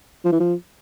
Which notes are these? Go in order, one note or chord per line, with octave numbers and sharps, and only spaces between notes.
F3
E3
F3